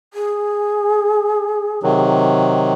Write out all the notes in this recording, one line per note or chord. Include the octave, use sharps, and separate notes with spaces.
G#4
C3 D#3 F#3